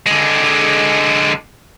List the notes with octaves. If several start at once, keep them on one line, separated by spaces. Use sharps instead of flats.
D3 G#3